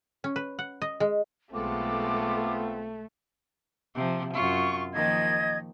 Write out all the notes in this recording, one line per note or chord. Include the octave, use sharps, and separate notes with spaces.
C#4
B4
F#5
D#5
G#3
B1 G#3 A3 B3 C4 F4 A4 D6
C3 F3
F#2 F4 C#6
D#3 F3 A#3 D#5 G#6